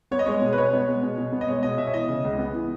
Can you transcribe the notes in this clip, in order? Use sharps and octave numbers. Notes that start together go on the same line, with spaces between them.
B3 C#5
D#5
G#3 C#5
B2
B4
B2 C#5
B3
G#3
B2
B2
B3
D#5
G#3 C#5
B2 D#5
B2 E5
C#5
E3 D#5
C#3
C#2
B3
E3